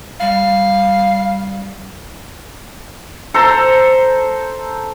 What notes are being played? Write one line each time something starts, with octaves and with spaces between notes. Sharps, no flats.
G3 F5
A4 C5 A#5